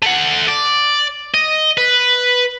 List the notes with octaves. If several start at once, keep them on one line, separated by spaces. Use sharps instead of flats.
A3 F#5
D5
D#5
B4